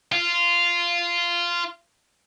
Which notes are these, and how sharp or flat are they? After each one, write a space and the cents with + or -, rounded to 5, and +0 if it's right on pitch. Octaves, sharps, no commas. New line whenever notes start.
F4 -10